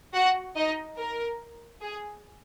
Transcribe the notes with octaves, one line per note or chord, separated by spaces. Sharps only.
F#4 F#5
D#4 D#5
A#4
G#4